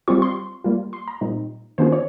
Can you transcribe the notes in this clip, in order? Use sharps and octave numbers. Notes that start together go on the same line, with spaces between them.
G3 C4 F4 C#6
C6
G3 A#3 F4
C6
A#5
A#2 G3 C4 D#4
D#3 A#3 C#4 F4 C5
C#5